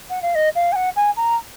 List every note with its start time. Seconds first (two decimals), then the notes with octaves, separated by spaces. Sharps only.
0.10 F#5
0.22 F5
0.35 D#5
0.55 F5
0.72 G#5
0.75 F#5
0.96 G#5
1.16 A#5